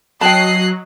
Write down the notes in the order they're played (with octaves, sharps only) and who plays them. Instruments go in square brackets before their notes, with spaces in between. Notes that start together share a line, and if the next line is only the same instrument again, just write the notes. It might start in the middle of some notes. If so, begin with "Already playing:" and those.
[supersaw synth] F#3 [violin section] D#5 F#6 C7 [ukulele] G5 A5